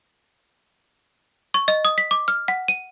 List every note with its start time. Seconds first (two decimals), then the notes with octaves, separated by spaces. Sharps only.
1.54 C#6
1.68 D#5
1.85 D#6
1.98 B6
2.11 D6
2.28 F6
2.48 F#5
2.68 D#7